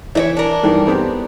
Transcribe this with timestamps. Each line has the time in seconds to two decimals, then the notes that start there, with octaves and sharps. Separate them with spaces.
0.15 E3 C#5 D#5 E5
0.37 D4 A#4
0.63 G2 D#3 E3
0.87 B3 C4 G4